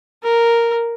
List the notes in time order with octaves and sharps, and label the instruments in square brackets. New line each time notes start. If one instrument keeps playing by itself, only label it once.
[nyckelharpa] A#4